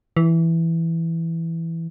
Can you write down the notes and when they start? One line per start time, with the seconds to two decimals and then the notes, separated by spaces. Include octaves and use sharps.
0.17 E3